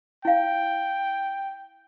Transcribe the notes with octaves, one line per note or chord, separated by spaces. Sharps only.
E4 F5 G5